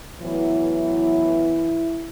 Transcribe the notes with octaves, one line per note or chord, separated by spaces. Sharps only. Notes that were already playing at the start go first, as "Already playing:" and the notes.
A2 E3 F#3 B3 E4